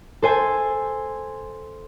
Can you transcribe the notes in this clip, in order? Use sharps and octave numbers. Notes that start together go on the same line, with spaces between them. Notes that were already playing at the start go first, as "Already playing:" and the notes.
A4 C5 G#5